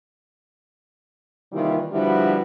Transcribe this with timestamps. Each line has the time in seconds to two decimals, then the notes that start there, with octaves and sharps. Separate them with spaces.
1.52 C3 D#3 E3 G3 A#3 F4
1.92 D3 F3 G3 E4 F#4 B4